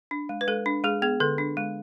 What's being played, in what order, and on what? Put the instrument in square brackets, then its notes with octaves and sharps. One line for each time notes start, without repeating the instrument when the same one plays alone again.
[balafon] D4
G#3
B4
G#3 A4
D4
G#3 G#4
B3 G#4
D3 A4
D4
G#3